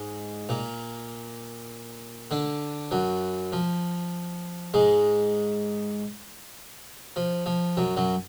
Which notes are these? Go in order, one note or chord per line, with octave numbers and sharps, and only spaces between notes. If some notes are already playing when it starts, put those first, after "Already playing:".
Already playing: G#2 G#3
A#2 A#3
D3 D4
F#2 F#3
F3
G#2 G#3
F3
F3
F#2 F#3
F#2 F#3